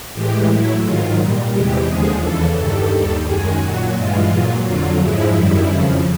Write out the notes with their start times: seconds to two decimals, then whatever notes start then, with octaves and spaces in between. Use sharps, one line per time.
0.14 A2 E3 G#3 G4
0.48 A2 F#3 E4
0.83 G#2 D#3 F#3 F4
1.18 A#2 G3
1.52 E2 C3 E3 G#3 G4
1.87 D#2 D3 F3 G#3 G#4
2.22 E2 C#3 E3 A4
2.57 G2 D#3 G3 A4
2.92 D#2 D#3 G3
3.26 F#2 D#3 G#3 G#4
3.61 A#2 F#3 F#4
3.96 G2 E3 G#3 F4
4.30 A#2 F#3
4.65 F2 D3 F#3 F4
5.00 G#2 F3 G#3 E4
5.35 F#2 D#3 G3
5.69 F2 C#3 F3